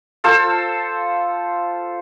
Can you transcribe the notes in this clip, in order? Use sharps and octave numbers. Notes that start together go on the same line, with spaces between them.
F4 A4 C5 E6